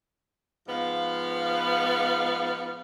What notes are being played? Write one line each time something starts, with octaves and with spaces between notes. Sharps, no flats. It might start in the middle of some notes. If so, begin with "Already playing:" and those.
G#2 F3 B3 F5